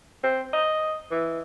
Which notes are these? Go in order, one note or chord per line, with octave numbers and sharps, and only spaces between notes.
C4
D#5
E3